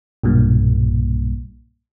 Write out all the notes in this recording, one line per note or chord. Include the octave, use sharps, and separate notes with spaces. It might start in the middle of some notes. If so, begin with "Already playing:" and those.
B1 G2 A#2